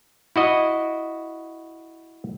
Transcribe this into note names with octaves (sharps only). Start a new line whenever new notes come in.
E4 F#4 D#5